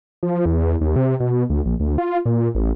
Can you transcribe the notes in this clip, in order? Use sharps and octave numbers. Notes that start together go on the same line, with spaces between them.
F3
E2
D#2
C3
B2
D2
A#1
D2
F4
A#2
A1